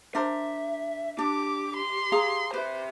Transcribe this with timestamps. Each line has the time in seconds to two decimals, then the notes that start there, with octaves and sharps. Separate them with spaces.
0.15 D4 A#4 C5 E5
1.18 D4 G4 D6
1.76 C6
2.12 G#4 F5 A#5
2.54 G4 B4 C5 E5